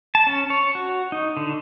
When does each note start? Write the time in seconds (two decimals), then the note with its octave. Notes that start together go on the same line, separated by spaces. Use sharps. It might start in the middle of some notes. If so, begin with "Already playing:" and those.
0.15 A5
0.27 C#4
0.50 C#5
0.75 F#4
1.12 D#4
1.37 D3